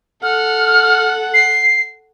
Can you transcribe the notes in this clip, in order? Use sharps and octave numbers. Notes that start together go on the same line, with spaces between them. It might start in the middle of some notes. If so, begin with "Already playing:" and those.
A4 F#5 F6
C7